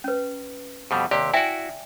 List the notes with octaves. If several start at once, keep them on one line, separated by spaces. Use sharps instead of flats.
C#4 B4
F2 B2 G3
D#2 C3 G4 D5
E4 F#4 E5 G5 G#5